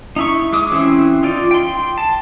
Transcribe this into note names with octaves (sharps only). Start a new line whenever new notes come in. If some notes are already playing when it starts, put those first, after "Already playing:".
D#4 E4 C#6
G#3 D6 D#6
E3 C4 C#4 E4
D#4 F4 D5
G5 C6
A5